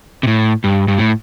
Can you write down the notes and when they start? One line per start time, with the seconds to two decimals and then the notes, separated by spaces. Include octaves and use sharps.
0.23 C3
0.27 A2
0.64 G2
0.88 G2
0.99 A2